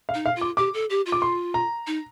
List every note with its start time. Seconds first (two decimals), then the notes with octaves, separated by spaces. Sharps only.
0.09 F5
0.14 D#4
0.26 F5
0.36 F4
0.41 D6
0.57 G4 D6
0.74 A4
0.90 G4
1.06 F4
1.12 D6
1.22 C6
1.54 A#5
1.87 D#4